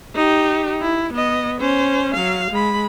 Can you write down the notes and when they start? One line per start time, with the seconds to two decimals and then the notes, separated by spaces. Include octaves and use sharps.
0.15 D#4 G4
0.82 E4
1.13 B3 D#5
1.61 C#4 C5
2.15 F#3 F5
2.51 G#3 B5